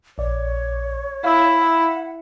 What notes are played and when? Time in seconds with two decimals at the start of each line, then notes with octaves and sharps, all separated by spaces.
0.18 A#1 C#5 D5
1.24 E4 F5 E6
1.60 F#5